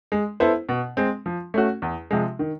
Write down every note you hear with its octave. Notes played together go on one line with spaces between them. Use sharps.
G#3
B3 E4 A4 C5
B2
G#3 C4
F3
A3 C#4 F#4
E2
C3 F3 G#3
D#3